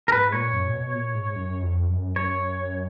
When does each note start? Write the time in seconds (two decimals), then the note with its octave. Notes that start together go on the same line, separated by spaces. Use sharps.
0.08 A#4
0.12 G#2 B4
0.32 A#2 C#5
0.53 F#2
0.67 A#2
0.73 B2
0.93 A#2
1.14 G#2
1.35 F#2
1.62 F2
1.89 F#2
2.16 F#2 C#5